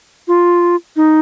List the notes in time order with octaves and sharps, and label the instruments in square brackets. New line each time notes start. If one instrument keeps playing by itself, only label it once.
[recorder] F4
D#4